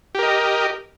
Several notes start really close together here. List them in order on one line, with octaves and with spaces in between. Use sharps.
G4 A#4 D#5